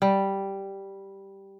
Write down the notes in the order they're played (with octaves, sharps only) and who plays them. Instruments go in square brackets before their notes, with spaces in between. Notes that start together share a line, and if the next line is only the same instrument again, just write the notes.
[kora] G3